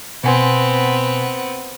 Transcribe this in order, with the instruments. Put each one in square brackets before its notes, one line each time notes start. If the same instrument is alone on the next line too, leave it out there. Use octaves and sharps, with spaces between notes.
[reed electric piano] B2 G#5 C6 [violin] B3 C4